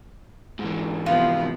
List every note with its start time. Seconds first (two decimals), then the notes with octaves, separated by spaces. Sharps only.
0.59 G#2 E3
1.06 C3 F3 B3 F4